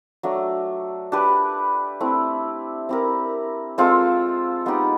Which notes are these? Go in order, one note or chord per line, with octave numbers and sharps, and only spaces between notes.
F#3 A3 D4
D4 G4 B4
A3 C4 E4
C4 E4 G4 A#4
G#3 C4 F4 A4
G#3 B3 D#4 G4